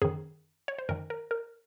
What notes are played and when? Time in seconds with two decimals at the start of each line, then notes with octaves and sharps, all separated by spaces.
0.02 F#2 D#3 G#4
0.68 C#5
0.78 C5
0.89 F#2 D#3 A#4
1.10 A#4
1.31 A#4